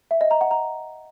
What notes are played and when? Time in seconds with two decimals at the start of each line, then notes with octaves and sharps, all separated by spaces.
0.11 E5
0.21 D#5
0.31 A#5
0.41 F#5
0.51 A#5